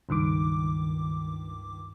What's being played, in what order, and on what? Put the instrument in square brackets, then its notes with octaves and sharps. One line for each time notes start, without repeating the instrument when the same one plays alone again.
[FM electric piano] C#2 G2 D#3 D6